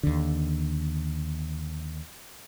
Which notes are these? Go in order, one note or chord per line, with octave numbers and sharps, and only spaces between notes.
D#2 D3